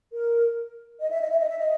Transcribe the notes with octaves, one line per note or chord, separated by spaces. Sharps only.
A#4
D#5
E5
D#5
E5
D#5
E5
D#5